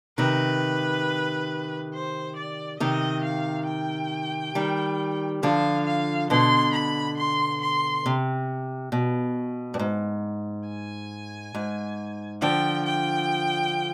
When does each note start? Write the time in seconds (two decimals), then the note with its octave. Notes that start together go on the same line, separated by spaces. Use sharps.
0.18 C3 D#3 B4
1.94 C5
2.36 D5
2.80 C3 D#3 D#5
3.24 F5
3.68 G5
4.55 D#3 G3
5.43 D3 F3 F5
5.86 F5
6.30 B2 D3 C6
6.73 B5
7.18 C6
7.62 C6
8.06 C3
8.92 B2
9.74 G2
9.79 G#2
10.68 G#5
11.55 G#2
12.42 D3 F3 G5
12.86 G5